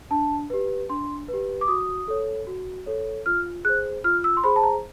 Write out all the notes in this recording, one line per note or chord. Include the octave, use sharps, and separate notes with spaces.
D4 A5
G4 B4
D4 C6
G4 B4
D6
F#4 D#6
A4 C#5
F#4
A4 C#5
F4 F6
G#4 C5 F#6
F4 F6
E6
C6
G#4 C5 B5
A5
A#5